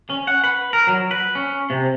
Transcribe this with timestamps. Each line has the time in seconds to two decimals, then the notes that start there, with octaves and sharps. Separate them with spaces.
0.10 C#4
0.27 F#5
0.44 B4
0.73 A#4
0.87 F#3
1.11 B4
1.35 C#4
1.70 C3